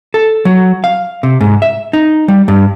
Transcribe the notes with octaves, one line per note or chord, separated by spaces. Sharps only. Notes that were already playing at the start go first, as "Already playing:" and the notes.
A4
F#3
F5
C3
G#2
E5
D#4
G3
G2